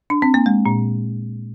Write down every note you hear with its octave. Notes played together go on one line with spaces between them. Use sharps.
D4
C4
A#3
G#3
A#2